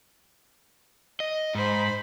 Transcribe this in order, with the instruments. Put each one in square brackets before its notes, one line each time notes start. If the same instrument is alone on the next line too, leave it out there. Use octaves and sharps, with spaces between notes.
[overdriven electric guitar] D#5
[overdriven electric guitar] G#2 [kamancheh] C5 B5